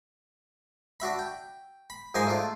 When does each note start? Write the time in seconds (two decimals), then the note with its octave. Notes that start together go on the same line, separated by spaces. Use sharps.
1.00 D4 F#4 E5 B5
1.19 G5
1.90 B5
2.15 G#2 F3 A#4 C5 G#5 D#6
2.27 A3 D4 F4